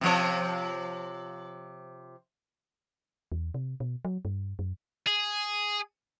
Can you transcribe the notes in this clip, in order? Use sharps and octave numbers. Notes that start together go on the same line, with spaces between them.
C3 F3 C#5
E2
C3
B2
F#3
G2
F#2
G#4